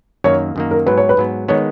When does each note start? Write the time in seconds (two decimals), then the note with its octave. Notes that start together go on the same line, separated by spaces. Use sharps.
0.24 F#2 D#3 A#3 C#5
0.56 F#2 D#3 A#3
0.71 A#4
0.86 G#2 F#3 B3 B4
0.98 C#5
1.09 B4
1.17 G#2 F#3 B3
1.48 D#3 G#3 B3 C#5